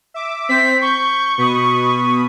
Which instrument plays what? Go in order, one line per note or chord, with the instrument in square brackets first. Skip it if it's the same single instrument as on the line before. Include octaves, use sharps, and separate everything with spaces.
[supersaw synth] E5 D6
[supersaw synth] C4 C5 [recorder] B6
[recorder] C#6 [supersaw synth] G6
[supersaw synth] B2 B5 D#6